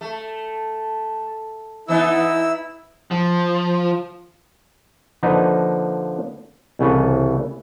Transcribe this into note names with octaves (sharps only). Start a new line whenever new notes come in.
A3
E3 B3 D#4 E4 E6
F3
D3 F3 A#3 D#4 B4
C2 C#3 E3 A4 B4